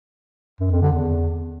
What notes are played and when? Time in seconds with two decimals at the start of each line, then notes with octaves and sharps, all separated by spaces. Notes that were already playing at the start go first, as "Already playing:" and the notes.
0.60 F#2
0.71 F2
0.82 D3
0.93 E2